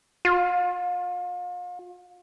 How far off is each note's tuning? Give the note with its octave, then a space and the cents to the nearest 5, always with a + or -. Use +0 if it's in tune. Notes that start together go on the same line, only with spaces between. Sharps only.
F4 +40